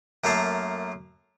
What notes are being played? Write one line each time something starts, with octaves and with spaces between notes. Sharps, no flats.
F#2 A3 A#3 F5 A5